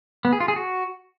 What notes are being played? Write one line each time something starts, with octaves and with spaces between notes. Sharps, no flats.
B3
G#4
F4
G#4
F#4